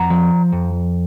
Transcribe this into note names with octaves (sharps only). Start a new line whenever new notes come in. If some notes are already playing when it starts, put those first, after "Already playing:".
Already playing: F2 F#5 A#5
F3
F2